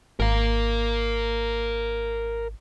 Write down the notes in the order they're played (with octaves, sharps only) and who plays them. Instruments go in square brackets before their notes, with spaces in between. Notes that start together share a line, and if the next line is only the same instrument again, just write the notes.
[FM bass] G#1 [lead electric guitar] A#4 F5